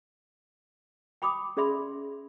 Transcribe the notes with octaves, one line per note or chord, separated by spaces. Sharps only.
G5 B5 D6 D#6
C#4 G#4 D5 E5 B5 C6